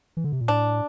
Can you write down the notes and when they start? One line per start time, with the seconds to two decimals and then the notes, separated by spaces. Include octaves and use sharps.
0.17 E3
0.24 D3
0.32 C3
0.41 A#2
0.48 A2 D4